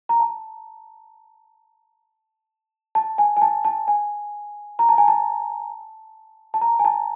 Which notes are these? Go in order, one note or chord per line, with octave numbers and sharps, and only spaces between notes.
A#5
A5
A5
G#5
G#5
A5
A5
G#5
A#5
A5
G#5
A5
A5
A#5
G#5
A5